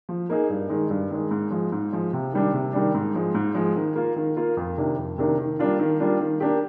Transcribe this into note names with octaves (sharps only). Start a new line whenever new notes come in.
F3
A#3 D#4 G#4
G2
D#3 G#3
G2
D#3 G#3
G#2
F3 G#3
G#2
F3 G#3
C3
D#3 G3 D4
C3
D#3 G3 D4
G#2
F3 G#3
G#2
F3 G#3
D#3
A#3 F4
D#3
A#3 F4
F2
C3 D#3 A#3 D4
F2
C3 D#3 A#3 D4
D#3
G3 A#3 D4 F4
D#3
G3 A#3 D4 F4
D#3
A#3 D4 G4